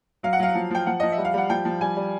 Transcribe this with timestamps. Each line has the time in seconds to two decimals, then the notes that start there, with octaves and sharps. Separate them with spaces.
0.23 F#3 F5
0.33 F#5
0.39 F#3 F5
0.55 F3
0.71 F3 G5
0.86 F3 F#5
1.00 F3 D#5
1.12 E5
1.18 G3
1.25 F5
1.34 G3 F#5
1.50 F3 G5
1.65 F3
1.81 G3 G#5
1.97 G3